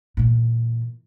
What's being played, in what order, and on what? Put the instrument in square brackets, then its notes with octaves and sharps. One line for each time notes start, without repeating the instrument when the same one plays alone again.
[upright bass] A#2 E3